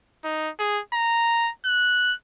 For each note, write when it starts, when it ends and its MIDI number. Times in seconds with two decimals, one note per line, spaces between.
0.24 0.50 63
0.60 0.80 68
0.94 1.51 82
1.65 2.14 90